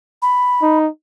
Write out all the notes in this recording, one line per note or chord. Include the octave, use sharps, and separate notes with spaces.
B5
D#4